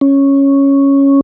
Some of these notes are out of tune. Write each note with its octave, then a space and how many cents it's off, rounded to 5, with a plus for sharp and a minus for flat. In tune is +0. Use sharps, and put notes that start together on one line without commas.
C#4 -5